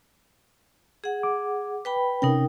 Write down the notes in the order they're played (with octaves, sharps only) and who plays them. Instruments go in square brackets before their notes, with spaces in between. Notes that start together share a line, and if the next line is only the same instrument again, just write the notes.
[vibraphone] G#4 F#5
[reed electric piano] D6
[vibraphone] B4 G5 B5
[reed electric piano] C3 C#4 [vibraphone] D#4 A#4 G5